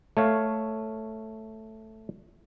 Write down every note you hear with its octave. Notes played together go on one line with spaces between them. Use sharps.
A3 C#5 F5